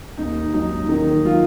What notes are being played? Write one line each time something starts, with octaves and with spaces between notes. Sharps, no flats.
D#2 D#4
F#3 D#4
D#3 D#4
F#3 F4